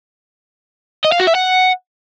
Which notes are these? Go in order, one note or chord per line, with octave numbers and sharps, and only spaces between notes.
D#5
F5
F#4
E5
F#5